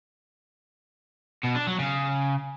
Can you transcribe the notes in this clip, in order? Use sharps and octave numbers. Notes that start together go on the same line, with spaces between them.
B2
D4
F#3
C#3